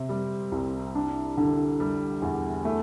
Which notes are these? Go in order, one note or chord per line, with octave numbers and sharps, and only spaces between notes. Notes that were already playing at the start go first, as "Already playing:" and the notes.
Already playing: C3 C4
G3
C2
D4
D3
G3
E2
A3